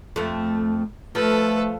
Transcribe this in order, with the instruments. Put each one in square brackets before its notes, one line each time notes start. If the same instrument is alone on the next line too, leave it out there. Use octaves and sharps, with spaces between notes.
[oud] F2 A3
[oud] F3 [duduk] A3 [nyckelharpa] A4 B4